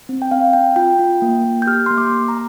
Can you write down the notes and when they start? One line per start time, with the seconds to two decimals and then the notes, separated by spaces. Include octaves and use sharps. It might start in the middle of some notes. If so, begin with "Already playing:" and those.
0.09 C4
0.22 G5
0.31 C4 F5
0.53 C4 G5
0.76 F4 G5
0.99 F4
1.22 A#3
1.44 A#3
1.62 G6
1.67 G4 F6
1.86 A#3 C6
1.98 D6
2.12 A#3
2.28 A#5